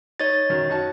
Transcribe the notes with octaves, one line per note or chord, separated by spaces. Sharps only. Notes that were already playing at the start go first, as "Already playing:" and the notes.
D#4 C#5 A6
F#2 D#3 F#3
D#4 F#4 A5